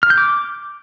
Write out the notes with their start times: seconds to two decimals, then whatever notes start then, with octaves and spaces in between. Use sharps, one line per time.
0.03 F6
0.10 G6
0.18 D6